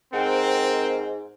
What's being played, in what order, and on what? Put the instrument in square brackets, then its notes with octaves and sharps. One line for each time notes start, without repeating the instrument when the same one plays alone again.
[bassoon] G#2 [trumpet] C4 [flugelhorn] A#4 [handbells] F#5 G5